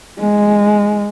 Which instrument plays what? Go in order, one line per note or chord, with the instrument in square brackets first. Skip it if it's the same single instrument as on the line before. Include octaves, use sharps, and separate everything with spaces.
[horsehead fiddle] G#3